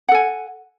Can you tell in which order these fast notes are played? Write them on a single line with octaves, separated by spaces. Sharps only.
F#5 A4 G#5